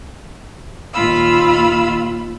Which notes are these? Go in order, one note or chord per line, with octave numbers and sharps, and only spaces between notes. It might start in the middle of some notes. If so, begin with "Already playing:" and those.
D#2 A#2 F4 F5 B5 E6